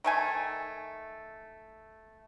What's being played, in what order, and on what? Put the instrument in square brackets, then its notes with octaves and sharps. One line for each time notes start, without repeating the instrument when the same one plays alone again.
[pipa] D#3 A3 G#5